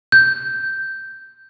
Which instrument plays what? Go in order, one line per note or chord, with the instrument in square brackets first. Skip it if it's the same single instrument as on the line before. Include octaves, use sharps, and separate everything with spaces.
[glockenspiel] G6